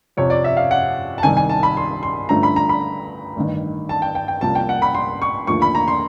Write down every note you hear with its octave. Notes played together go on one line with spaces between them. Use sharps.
F2 C3 F3 C#5
D5
E5
F5
F#5
A5
C2 C3 D#3 G#5
G#5
A5
B5
C6
C6
G2 D3 F3 A3 C#4 A#5
B5
A#5
B5
A1 G2 D#3
A5
G5
G5
G5
C2 C3 F3 A#3 C#4 A5
G5
F#5
B5
C6
C#6
D#2 D3 F3 A3 C#6
B5
A#5
C6